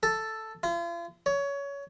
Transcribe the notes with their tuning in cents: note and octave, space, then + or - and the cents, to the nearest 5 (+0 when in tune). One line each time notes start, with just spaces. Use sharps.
A4 +0
F4 -40
C#5 +20